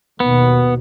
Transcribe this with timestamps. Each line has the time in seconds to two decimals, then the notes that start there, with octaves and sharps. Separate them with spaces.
0.20 D#2 B2 B3